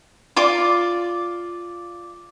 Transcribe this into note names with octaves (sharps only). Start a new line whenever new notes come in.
F4 D5 D6